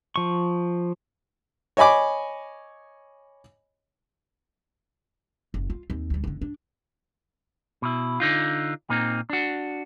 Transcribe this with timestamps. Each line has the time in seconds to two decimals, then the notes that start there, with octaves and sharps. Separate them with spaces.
0.16 F3 C#6
1.77 C#5 D#5 G#5 B5 D6
5.54 F#1
5.70 F4
5.90 D#2 C4
6.10 D2 G3
6.24 F#1 D3
6.42 D4
7.82 B2 E4
8.20 D3 D#4 F4
8.90 A#2 A#3 C4 D#4
9.30 D4 F#4